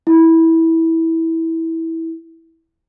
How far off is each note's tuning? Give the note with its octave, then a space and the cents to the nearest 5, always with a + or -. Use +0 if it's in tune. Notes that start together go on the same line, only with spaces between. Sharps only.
E4 -15